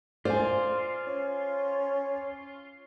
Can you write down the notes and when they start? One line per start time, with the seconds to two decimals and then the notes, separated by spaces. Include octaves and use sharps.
0.25 F4 C5 D5 G#5
1.07 C#4